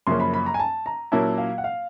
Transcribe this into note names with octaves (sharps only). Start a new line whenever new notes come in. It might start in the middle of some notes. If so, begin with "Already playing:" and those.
F#2 C#3 F3 A#3 C#4 C6
B5
B5
A#5
G#5
A5
A#5
A#2 F#3 A#3 C#4 E4 A5
F5
F#5
F5